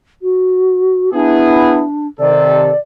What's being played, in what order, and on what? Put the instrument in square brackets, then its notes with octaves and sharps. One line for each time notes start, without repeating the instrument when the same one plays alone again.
[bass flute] F#4
[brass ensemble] B3 E4 G#4 [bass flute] D4
[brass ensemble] C3 D#3 A4 [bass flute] D5